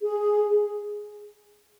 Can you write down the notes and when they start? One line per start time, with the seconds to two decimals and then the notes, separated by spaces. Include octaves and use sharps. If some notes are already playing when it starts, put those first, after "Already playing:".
0.02 G#4